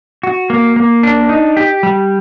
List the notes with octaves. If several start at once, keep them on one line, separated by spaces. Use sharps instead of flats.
F#4
A#3
A#3
D4
D#4
G4
G3